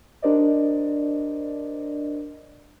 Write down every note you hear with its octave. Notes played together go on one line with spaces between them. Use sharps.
D4 G4 A#4 C5 D5 D#5